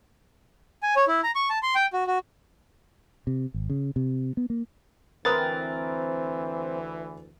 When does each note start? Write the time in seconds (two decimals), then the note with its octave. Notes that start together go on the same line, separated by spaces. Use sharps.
0.83 G#5
0.96 C#5
1.08 E4
1.24 A#5
1.35 C#6
1.50 A5
1.63 C6
1.75 G5
1.93 F#4
2.07 F#4
3.27 C3
3.54 G#1
3.70 C#3
3.96 C3
4.37 B3
4.50 A#3
5.25 D2 E3 C4 A#4 B4 D#6 A6